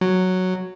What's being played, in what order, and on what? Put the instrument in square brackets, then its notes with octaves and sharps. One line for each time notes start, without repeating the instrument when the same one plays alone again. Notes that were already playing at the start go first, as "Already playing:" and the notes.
[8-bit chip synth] F#3